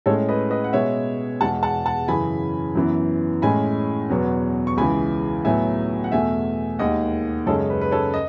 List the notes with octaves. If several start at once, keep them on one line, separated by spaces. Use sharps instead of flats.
A2 G#3 C#4 A4 C#5
B4 D#5
B4 D#5
F#5
B2 G#3 B3 C#5 E5
E2 B2 G#3 F#5 A5
F#5 A5
F#5 A5
F#2 C#3 E3 G#5 B5
F#2 E3 B3
A2 G#3 C#4 G#5 B5
E2 B2 F#3 B3
C#6
C#2 C#3 E3 G#5 B5
A2 F#3 B3 E5 G#5
F#5
E2 B2 A3 E5 G#5
D#2 D#3 G#3 D#5 F#5
F#2 C#3 G#3 C#4 A4
B4
B4
A4 C#5
D#5